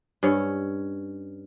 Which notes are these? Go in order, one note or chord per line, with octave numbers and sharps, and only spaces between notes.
G2 C#4 C#5